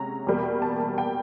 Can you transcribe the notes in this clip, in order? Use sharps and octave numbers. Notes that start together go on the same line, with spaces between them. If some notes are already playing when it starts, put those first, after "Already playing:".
Already playing: C3 G#3 C#4 A#5
E2 B2 G3 A#3
A5
G5